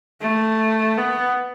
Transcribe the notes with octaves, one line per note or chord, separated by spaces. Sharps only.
A3
B3